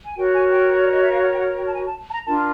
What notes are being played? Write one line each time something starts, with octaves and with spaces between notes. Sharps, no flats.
G#5
F#4 A#4 C#5 G5
G#5
G5
D5
D#5
E5
F5
F#5
G5
F#5
G5
A5
G#5
A5
A5
A#5
D4 F4 A#4 A5